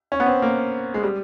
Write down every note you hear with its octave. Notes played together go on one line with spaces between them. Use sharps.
C#4
B3
C4
A#3
G#3
G3